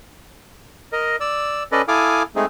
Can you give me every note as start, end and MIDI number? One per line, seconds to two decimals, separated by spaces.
0.92 1.16 70
0.92 1.16 75
1.20 1.63 74
1.20 1.63 88
1.72 1.82 61
1.72 1.82 69
1.72 1.82 71
1.72 1.82 74
1.72 1.82 75
1.88 2.23 64
1.88 2.23 69
1.88 2.23 77
1.88 2.23 80
1.88 2.23 86
1.88 2.23 87
2.36 2.46 56
2.36 2.46 57
2.36 2.46 60
2.36 2.46 63
2.36 2.46 68